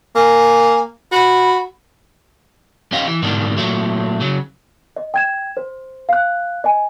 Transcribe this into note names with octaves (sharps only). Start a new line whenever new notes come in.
A#3 G#5
F#4 B5
C#4 G4 D#5 F5
E3
G#2 B2 D3 D#3 G3
A#2 F#3 A3
C#3 F#3
D#5
G5 G#6 E7
C5
F5 F#6
D#5 G#5